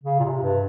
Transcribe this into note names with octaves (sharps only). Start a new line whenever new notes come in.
C#3
A#2
C3
G2